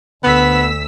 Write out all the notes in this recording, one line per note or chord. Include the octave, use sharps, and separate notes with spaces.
D2 B3 E6 B6